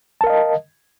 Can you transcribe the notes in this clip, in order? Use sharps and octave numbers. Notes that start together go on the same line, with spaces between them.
A#4 D#5 F5 A5